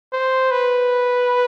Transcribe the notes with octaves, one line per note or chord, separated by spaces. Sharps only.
C5
B4